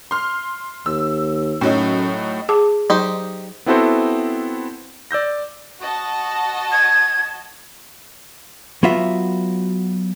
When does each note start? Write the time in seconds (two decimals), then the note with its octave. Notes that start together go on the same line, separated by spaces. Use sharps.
0.11 C6 F6
0.86 D#2 E6
1.61 F#2 A2 F#3 D#4
2.49 G#4 A5 D6
2.90 F#3 D#4 G4 C5
3.66 B3 C4 E4 F#4 A4 C5
5.11 D5 E6 G6 A#6
5.81 F#4 D#5 A5
6.72 G#6
8.83 F#3 B3 F4 F#4 E5